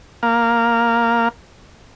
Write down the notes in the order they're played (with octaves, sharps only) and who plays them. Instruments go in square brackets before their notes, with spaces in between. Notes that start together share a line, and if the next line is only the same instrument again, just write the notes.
[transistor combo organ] A#3 F5